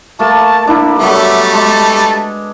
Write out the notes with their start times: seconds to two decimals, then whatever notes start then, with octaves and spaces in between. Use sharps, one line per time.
0.19 A3 A#3 A5
0.67 A#3 D4 E4
0.99 F#3 G3 A3 B3 E5
1.53 G#3 A5